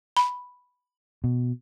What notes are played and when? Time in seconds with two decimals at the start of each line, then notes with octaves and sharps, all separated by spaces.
0.17 B5
1.24 B2